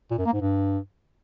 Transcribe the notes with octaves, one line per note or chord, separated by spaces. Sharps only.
A#2
F#2
A#3
G#2
G2